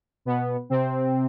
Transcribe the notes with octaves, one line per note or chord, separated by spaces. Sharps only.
B2 B3
C3 C4